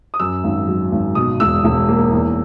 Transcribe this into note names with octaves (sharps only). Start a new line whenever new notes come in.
D#6
F#2 E6
G#1
F#3
G#1
B2 D#6
E1 E6
E1
A#3
E2